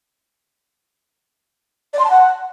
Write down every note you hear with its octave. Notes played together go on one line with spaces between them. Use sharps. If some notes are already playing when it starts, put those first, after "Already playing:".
D5
C6
A5
F#5